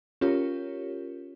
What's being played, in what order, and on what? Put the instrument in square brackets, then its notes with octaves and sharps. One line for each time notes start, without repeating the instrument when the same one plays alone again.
[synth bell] C#4 F4 G4 A#4 C#5